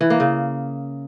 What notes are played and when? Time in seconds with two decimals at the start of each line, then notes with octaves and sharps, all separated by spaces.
0.01 E3
0.10 A#3
0.20 C#3